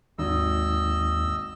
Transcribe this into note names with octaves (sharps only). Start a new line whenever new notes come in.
G#1 D#2 D#5 E6